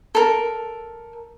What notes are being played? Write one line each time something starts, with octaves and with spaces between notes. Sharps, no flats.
A4 A#4